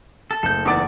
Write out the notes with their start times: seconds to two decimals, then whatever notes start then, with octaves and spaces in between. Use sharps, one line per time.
0.31 A4
0.43 F#1 A3 A4 G6
0.65 E2 D#4 B4 D5 D6 A6